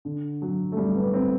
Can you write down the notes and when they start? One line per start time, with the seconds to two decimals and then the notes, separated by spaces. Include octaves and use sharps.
0.05 D3
0.42 F#3
0.72 A3
0.77 G3
0.95 B3
1.14 C4